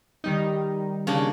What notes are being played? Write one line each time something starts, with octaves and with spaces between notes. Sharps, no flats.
D#3 G3 D#4
C#3 A#3 D4